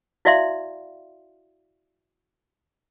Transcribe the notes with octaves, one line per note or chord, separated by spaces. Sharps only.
E4 F#4 D5 E5 F5 C6